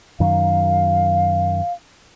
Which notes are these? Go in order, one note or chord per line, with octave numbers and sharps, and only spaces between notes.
F#2 D#3 F#3 F5